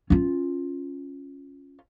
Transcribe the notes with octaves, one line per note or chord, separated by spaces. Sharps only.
C#4 F4